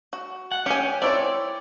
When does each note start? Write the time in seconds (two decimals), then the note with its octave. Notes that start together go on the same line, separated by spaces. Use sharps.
0.13 F#4
0.52 F#5
0.66 C#4 G4 G#5
1.02 C4 E4 C#5 D5